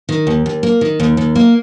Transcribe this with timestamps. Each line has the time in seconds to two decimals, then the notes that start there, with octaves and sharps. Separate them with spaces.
0.09 D#3
0.27 D#2
0.46 D#2
0.63 A#3
0.81 D#3
1.00 D#2
1.17 D#2
1.35 A#3